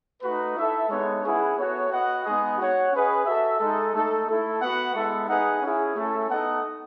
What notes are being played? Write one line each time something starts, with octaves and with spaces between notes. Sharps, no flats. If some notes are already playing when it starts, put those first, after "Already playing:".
A3 D#4 F#4 B4
E4 A4 E5
G#3 B3 D#4 A4 C#5
C#4 E4 G#4 B4 F#5
B3 F#4 A4 C#5
F#4 B4 D#5 F#5
G#3 B3 D#4 G#4 D#5
F#4 C#5 F#5
C#4 G#4 B4 D#5
F#4 A4 E5
G#3 D#4 A4
A3 D#4 A4
A3 E4 A4
B3 F#4 B4 F#5
G#3 B3 E4 A4 E5
D#4 G#4 B4 F#5
C#4 E4 G#4
A3 C#4 E4 A4
B3 D#4 A4 D#5 F#5